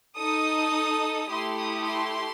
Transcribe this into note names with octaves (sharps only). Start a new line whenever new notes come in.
D#4 A4 D#6
A3 E4 G4 C6
D#6
C6